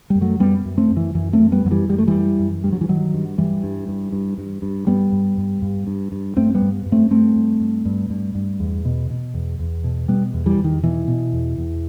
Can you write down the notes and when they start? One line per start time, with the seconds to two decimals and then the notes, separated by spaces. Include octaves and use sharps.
0.10 F#2 G3
0.21 F#3 A3
0.40 F#2 G3 B3
0.65 F#2
0.78 A3 C4
0.91 F#2
0.97 E3
1.15 F#2 E3
1.33 A3 C4
1.39 F#2
1.52 G3 B3
1.65 F#2 F#3
1.71 E3 G3
1.89 F#2 G3
1.98 A3
2.07 E3 G3
2.14 F#2
2.39 F#2
2.64 G2 G3
2.73 F#3
2.81 E3
2.89 G2 D#3 F#3
3.14 G2
3.38 G2 E3 G3
3.63 G2
3.88 G2
4.12 G2
4.38 G2
4.62 G2
4.87 G2 G3 B3
5.12 G2
5.37 G2
5.62 G2
5.87 G2
6.12 G2
6.36 G2 A3 C4
6.55 G3 B3
6.62 G2
6.86 G2
6.92 A3 C4
7.11 G2 A3 C4
7.36 G2
7.60 G2
7.85 G2
8.10 G2
8.35 G2
8.60 E2
8.85 B2
9.10 B2
9.34 E2
9.59 E2
9.84 B2
10.08 B2 G3 B3
10.33 E2
10.46 E3 G3
10.58 E2
10.64 D#3
10.83 B2 E3
11.08 B2
11.33 E2
11.57 E2